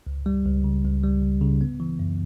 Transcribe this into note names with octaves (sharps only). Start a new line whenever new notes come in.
C#2
G3
C#2
C#3
C#2
G3
C#2
C#3
B3
E3
F#2